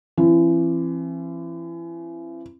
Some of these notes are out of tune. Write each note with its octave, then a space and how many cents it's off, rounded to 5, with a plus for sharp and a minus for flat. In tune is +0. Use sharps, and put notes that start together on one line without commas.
E3 +35 C4 +35